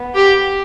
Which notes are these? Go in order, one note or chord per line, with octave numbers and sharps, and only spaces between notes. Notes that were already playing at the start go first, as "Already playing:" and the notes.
Already playing: B3
G4